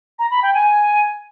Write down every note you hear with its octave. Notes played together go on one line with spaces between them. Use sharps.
A#5
B5
G5
G#5